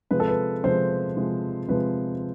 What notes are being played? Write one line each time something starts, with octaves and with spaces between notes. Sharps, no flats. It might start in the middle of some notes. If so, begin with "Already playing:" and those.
C3 F3 G#3 B4
A4
B4
C3 F3 G#3 C5
C3 F3 G#3
C3 F3 G#3 B4